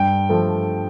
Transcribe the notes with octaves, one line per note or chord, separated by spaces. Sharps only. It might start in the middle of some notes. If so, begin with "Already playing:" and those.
Already playing: G2 G5
F3 A3